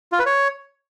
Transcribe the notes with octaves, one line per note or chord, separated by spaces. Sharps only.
F4
B4
C#5